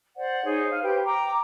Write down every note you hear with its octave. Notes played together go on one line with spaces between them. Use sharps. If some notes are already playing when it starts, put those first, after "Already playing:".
C5 D5 F#5
D#4 G#4 C5 C#5
F5
G4 B4 C5 G5
G5 A#5 D6